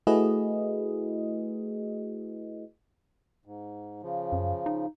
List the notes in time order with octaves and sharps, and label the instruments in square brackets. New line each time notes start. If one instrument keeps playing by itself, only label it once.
[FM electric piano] A3 E4 F#4 G#4 B4 D#5
[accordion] G#2
C#3 F3
[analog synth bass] F#2
D#4